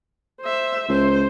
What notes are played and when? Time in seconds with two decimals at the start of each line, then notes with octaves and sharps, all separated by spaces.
0.41 C5 E5
0.89 C#2 C5